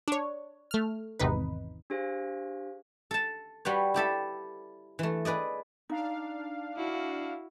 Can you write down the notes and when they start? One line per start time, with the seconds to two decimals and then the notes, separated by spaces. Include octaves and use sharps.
0.08 D4 C#5
0.71 A3 F6
1.19 G#1 E2 C3 D#4 B4
1.90 D4 G4 G#4 C5 F5
3.11 A4 A5
3.65 G3 F#4 B4 C#5
3.94 E4 G4 A4 E5
4.99 E3 A3
5.25 G#4 B4 D5 D#5
5.89 D4 D#4 F5
6.77 E4 F#4